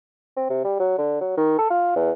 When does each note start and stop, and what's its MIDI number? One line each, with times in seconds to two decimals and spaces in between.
0.36 0.46 60
0.49 0.62 48
0.64 0.77 55
0.79 0.97 54
0.98 1.16 50
1.21 1.32 54
1.37 1.55 51
1.58 1.66 69
1.70 1.95 65
1.96 2.11 40